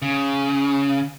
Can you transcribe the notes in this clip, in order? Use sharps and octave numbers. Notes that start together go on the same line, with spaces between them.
C#3